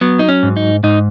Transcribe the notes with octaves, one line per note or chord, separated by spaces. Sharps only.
F#3 B3
D#4
C#4
G#2
D#4
G#2 D#4